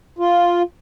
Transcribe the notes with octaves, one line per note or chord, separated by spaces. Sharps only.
F4